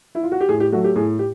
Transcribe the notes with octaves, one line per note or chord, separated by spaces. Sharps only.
E4
F4
F#4
G4
A2 G#4
G4
F#3 A3 F#4
G4
A2 G#4
G4